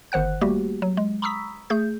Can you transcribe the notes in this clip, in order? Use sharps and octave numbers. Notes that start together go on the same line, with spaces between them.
G1 D#3 C5 F#5 F#6
G3 A3 A#3 F#4 G4
F#3
G#3
A#5 B5 C#6 D#6 E6 B6
A3 G#4 G6